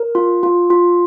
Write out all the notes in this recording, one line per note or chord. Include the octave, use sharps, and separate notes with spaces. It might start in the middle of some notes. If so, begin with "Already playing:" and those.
Already playing: A#4
F4
F4
F4